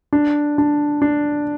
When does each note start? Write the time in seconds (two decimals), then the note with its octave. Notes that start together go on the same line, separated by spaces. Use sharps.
0.13 D4
0.58 D4
1.02 D4